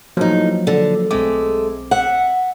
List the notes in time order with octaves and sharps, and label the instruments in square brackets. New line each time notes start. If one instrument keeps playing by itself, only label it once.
[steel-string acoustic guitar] A2 D#4 [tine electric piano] F3 F#3 A#3
[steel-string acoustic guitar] D3
[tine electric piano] B1 C4 D6 [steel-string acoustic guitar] G#3 A3
[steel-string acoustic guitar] E5 F#5